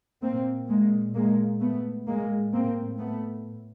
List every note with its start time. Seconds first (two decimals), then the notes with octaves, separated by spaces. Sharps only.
0.22 A#2 A#3 C4
0.68 G#3 A#3
1.15 G#3 A#3
1.60 A3 B3
2.07 A2 G#3 A#3
2.53 A#3 C4
2.98 A3 B3